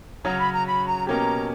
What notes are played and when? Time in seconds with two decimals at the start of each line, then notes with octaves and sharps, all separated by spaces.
0.24 C#3 F#3 C#4 F#4 C#5 A#5
0.38 B5
0.52 A#5
0.66 B5
0.86 A#5
1.07 B2 A#3 C#4 G4 A#5